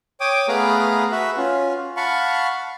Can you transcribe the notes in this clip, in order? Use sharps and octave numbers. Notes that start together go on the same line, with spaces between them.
C#5 G5 D6 D#6
A3 B3 G#4 B4 F5 A#5
F#4 B4 E5
C#4 F4
F5 F#5 A5 B5 C#6